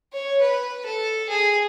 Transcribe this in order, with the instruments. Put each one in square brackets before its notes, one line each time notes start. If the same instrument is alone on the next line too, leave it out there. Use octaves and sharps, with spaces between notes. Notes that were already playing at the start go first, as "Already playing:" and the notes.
[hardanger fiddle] C#5
B4
A4
G#4